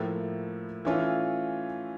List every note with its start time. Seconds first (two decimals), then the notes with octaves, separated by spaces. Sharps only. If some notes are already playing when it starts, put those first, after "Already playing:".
Already playing: A2 F3 A#3 E4 A4
0.85 E3 A3 C#4 F4